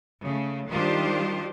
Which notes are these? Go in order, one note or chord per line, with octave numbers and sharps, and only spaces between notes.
C#3 A3
D#3 G3 D4 F4 G4 C5